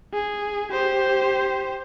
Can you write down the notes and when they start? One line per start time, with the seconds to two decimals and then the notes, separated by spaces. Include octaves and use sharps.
0.14 G#4
0.71 G4 C5